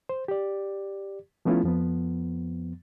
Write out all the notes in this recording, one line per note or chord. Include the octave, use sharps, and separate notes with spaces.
C5
G4 D5
F3 A3 B3 C#4 E4 F4
F2 F3 B3